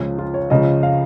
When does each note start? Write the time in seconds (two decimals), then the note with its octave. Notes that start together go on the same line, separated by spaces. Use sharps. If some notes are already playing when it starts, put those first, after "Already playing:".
Already playing: C#2 C#3 F3
0.18 F4
0.34 C#5
0.50 C#2 C#3 F3 D#5
0.83 F5